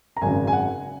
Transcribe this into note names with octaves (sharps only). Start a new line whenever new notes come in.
A#5
G#1 F#2 C#3 G#5
G#5
F#5